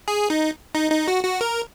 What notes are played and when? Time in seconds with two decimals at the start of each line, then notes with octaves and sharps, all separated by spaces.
0.08 G#4
0.30 D#4
0.75 D#4
0.91 D#4
1.08 F#4
1.24 F#4
1.41 A#4